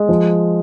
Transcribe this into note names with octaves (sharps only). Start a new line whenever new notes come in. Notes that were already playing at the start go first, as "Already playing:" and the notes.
Already playing: G#3
F3